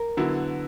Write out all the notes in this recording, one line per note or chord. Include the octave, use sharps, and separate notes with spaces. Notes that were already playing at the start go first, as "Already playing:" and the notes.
Already playing: A#4
D3 F#3 B3 E4